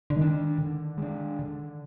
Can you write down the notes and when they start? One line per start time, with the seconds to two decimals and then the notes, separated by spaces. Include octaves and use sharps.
0.10 D3
0.16 D#3 G#3 D4
0.58 D3
0.97 G#3 D4
1.39 D3